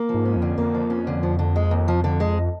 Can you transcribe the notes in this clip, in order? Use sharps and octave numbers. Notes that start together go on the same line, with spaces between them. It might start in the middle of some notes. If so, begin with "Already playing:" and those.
Already playing: A#3
F3
G#2
C#4
F2
D3
F2 A#3
F3
C#4
D3
F3
D3
G#3
D#2
F3
D3
G#3